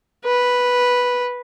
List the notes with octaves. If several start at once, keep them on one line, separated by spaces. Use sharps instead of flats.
B4